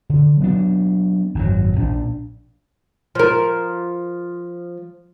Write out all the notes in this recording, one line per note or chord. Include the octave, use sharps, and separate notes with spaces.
D3
F#3 B3 D4
G#1 F#2 C#3 F#3
A#1 D4
F3 A#4